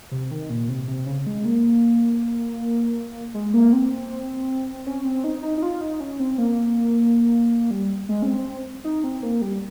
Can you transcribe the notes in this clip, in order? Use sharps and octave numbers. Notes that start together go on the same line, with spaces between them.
C3
D#3
A#2
C3
C3
C#3
G#3
A#3
G#3
A#3
C4
C#4
C4
D#4
D#4
D#4
F4
D#4
C#4
C4
A#3
G3
G#3
C#4
C4
D#4
C4
A#3
G3